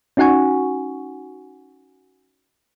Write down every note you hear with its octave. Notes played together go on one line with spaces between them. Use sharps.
C#4 D#4 F#4 F#5 G#5 C#6